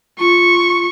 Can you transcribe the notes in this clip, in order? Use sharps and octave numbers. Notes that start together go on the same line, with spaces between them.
F4 C#6